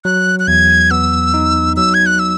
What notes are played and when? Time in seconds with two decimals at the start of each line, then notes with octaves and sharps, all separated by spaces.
0.05 F#3 F#6
0.40 F#6
0.48 E2 G#6
0.91 B3 E6
1.34 D#4
1.77 F#3 E6
1.94 G#6
2.06 F#6
2.19 E6